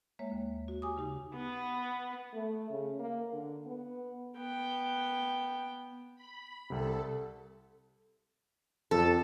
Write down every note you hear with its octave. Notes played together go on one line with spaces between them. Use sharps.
G#3 A#3 C#5 E5
D#2
F#4
G4 G#5 D6 D#6
C#3 D#4 G4
B3
A3
C#3
A#3
D3
B3
B3 G5
B5
C2 C3 A4
F2 A4